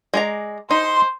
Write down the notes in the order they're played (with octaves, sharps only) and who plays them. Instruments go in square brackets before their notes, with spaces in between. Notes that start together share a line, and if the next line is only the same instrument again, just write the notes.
[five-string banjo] G#3 D5 A#5
[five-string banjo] D#4 [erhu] C5 [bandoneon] C6